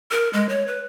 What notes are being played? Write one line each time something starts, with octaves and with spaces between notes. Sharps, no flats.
A#4
G#3
C#5
B4